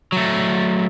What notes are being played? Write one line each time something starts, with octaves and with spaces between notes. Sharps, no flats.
F#3 A3